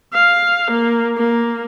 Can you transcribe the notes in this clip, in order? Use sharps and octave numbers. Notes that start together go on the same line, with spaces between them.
F5
A#3
A#3